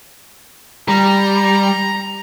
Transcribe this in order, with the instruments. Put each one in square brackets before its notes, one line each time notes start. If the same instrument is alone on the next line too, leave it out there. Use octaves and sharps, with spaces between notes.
[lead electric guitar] G3 [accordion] A#5